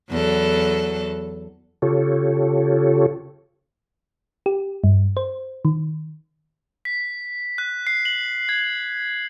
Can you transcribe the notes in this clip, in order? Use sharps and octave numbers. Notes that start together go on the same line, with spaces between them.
E2 F#3 A4
C#3 F4 G4 A4 C#5
G4
G2
C5
D#3
B6
F#6
C7
F#7
G#6